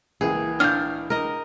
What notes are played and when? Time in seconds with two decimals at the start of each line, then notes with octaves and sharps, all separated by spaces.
0.21 C#2 E3 A#3 G#4
0.60 D4 F5 F6 G6
1.10 A#4 D#5